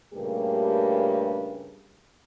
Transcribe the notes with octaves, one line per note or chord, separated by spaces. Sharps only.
G2 A#2 C#3 A3 A#3 G4